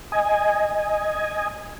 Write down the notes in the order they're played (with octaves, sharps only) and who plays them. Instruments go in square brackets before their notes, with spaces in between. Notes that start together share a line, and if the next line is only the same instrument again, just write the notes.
[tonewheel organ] D#5 G#5